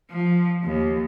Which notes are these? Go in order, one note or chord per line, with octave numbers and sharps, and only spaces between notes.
F3
D#2